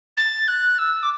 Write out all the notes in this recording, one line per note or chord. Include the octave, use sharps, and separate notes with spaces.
A6
F#6
E6
D6